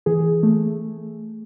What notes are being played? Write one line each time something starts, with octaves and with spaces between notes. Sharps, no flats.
E3 G#4
A3